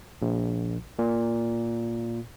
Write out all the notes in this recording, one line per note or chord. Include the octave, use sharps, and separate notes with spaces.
A#1
A#2